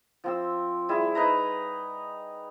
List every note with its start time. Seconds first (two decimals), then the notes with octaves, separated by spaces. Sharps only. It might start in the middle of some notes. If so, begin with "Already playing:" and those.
0.24 F3 C4 E6
0.89 G3 E4 G#4
1.15 D#4 B4 A#5